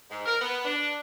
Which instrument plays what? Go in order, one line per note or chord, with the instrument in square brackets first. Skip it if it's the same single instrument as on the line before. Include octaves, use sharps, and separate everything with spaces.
[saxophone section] G#2
A#4
B3
D4